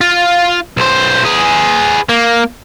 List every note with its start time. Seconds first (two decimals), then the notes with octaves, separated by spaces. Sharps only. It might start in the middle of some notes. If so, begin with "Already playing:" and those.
0.01 F4
0.77 B1 C5
1.25 G#4 B4
2.09 A#3